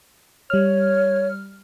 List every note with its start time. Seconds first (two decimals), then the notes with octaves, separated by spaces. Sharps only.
0.50 G3 C#5 F6